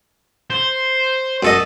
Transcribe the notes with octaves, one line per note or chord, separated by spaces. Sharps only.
C5
F#2 A4 D#5